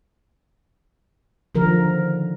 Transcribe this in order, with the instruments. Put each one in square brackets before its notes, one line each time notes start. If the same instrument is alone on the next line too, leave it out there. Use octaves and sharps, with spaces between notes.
[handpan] D3 D#3 F3 A#4